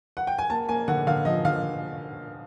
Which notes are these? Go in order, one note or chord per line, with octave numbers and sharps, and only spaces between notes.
F#5
G5
G#5
A#3 A5
A#3 G#5
D3 F#5
D3 F5
F3 D#5
D3 F5